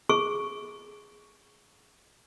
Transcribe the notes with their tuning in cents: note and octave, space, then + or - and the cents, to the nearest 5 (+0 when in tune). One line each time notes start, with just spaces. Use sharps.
G#4 +0 C#6 +0